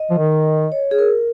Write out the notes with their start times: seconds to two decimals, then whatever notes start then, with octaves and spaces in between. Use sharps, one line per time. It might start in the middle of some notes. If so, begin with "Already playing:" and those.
Already playing: D#5
0.10 F3
0.18 D#3
0.72 C#5
0.91 G#4
0.99 A#4